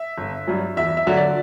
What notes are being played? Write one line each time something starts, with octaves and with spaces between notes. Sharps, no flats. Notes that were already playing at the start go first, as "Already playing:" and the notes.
Already playing: E5
G1
G2 F#3
E2 E5
E5
D3 F#3
D5